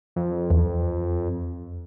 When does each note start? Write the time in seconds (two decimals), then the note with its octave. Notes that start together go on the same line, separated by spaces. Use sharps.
0.16 F2
0.50 E2